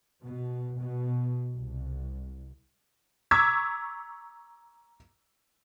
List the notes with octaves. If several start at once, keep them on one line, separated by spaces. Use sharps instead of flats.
B2
B2
C2
A#5 C#6 D6 E6 G#6 B6